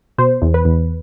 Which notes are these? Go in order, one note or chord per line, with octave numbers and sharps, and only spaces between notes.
B2 C5
E2
B4
E2